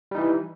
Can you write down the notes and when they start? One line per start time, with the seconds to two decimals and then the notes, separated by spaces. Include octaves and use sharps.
0.11 G3
0.15 D#4
0.18 E3